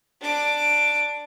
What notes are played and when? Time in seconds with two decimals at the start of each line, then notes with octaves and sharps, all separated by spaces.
0.21 D4 D6